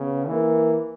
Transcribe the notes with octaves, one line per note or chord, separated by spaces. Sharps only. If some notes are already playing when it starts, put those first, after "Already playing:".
Already playing: C#3 B3
E3 A#3